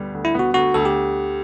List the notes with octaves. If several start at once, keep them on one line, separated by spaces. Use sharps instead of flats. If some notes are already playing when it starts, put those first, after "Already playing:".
Already playing: D2 D3 G3 B3
D2
E4
B3 F#4
D2 F#4
D2 A4
G4